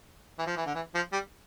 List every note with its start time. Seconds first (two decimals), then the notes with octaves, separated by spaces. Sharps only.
0.38 E3
0.46 F3
0.57 E3
0.66 D3
0.75 E3
0.95 F3
1.13 G3